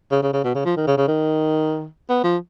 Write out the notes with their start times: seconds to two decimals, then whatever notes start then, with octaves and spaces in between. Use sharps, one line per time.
0.12 C#3
0.22 C#3
0.33 C#3
0.44 B2
0.54 C#3
0.65 F3
0.76 D#3
0.87 C#3
0.97 C#3
1.08 D#3
2.10 B3
2.24 F3